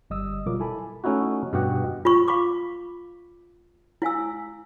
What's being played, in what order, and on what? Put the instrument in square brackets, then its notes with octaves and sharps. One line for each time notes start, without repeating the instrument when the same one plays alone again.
[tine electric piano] G1 G3 D#5 D#6 E6
B2 F#3 G3 F4 A#4 D6
E4 A4 G#5 A5 B5
[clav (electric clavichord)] A3 C#4 D#4 E4 F#4
G2 B2 F#4 G4 D#5 F#5
[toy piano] F4 B5 C#6
F5 B5 C#6 D6
E4 F5 G#5 E6